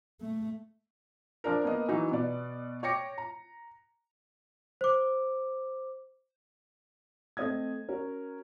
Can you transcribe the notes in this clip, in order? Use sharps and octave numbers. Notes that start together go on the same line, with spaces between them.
A3
F3 D4 A#4
A#3 B3 D#5
E3 F#3 D#4 F#4
B2 B3 D5
C#5 G5 D6 A#6 C#7
A#5
C5 D6
A3 C4 D#5 D#6 G#6
C#4 F#4 A#4